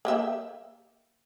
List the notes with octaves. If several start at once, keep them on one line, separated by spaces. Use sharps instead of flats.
A#3 G4 E5